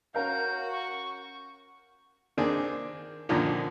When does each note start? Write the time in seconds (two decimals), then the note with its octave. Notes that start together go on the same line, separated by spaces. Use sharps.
0.15 C#4 F#4 A#4 F5 G6
0.72 C#6
2.37 D#3 A#3 C4 D4 G#4
3.29 F#2 A#2 D3 D#3 F3